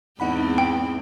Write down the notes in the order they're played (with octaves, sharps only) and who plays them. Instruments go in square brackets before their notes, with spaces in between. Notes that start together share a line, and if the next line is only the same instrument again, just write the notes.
[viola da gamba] E2 G#2 C4 [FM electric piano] D#4 F#5 B5
[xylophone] G5